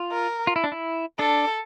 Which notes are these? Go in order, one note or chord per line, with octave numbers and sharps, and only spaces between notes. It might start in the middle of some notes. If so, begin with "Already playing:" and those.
Already playing: F4
A#4
F4
E4
D4
E4
D4 A4